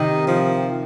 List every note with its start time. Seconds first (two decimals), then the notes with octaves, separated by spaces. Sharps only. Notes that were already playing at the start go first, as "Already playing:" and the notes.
Already playing: C3 D#3 D#4
0.27 F3